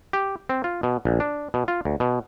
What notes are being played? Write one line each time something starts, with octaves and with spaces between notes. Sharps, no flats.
G4
C4
F4
B2
A#1
D4
B2
F4
D2
B2